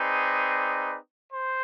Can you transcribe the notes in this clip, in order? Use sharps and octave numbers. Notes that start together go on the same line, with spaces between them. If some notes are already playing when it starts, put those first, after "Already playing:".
Already playing: C4 D#4 G#4 B4 D5
C5